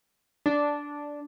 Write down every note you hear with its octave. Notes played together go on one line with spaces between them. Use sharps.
D4